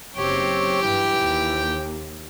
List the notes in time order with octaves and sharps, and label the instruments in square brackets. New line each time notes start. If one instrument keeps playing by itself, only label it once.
[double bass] F#1 F#3 [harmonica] C4 C#5 [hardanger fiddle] G4
[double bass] G2 [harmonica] E3 G5
[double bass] D#2